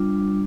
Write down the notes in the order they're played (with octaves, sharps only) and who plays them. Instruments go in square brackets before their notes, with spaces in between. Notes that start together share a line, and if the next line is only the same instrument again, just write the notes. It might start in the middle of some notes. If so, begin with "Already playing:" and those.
Already playing: [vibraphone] G3 D4 F4